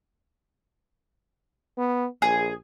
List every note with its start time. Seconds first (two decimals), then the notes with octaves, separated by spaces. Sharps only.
1.78 B3
2.22 A#1 G#4